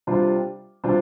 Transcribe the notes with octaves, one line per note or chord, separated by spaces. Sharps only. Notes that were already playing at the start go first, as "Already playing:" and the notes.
C3 G3 D4 F4 C5
C3 G3 D4 F4 C5